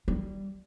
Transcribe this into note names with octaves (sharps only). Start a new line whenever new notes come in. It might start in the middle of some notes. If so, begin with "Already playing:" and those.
G3